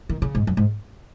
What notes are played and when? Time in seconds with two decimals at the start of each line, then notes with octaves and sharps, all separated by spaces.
0.10 D#3
0.22 C#3
0.35 G#2
0.47 F#2
0.57 G#2